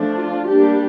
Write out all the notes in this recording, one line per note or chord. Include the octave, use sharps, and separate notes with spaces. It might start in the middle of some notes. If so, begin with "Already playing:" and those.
Already playing: F3 A3 D4
F4
G3 A#3 D4 G4